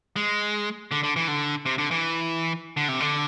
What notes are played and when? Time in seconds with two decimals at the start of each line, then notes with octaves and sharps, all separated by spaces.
0.16 G#3
0.91 D3
1.03 D3
1.16 E3
1.28 D3
1.66 C3
1.78 D3
1.91 E3
2.77 D3
2.88 C3
3.00 D3